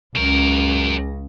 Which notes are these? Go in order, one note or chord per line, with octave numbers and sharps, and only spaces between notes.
C#2 C#3 F#3 A#4